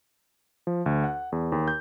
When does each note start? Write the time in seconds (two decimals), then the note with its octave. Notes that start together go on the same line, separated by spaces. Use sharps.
0.67 F3
0.86 D2
1.04 F#5
1.32 E2
1.52 D#2
1.68 G6